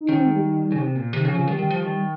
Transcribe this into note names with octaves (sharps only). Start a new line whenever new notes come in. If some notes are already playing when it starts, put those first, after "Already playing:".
D#4
D#3 C#4
C4
G#3
G3
C#3
C3
A#2
C3 D#3
C#3
F3
C#3
D#3 G3
D#3
F3
D#3